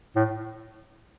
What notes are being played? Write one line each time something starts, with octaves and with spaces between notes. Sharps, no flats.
A2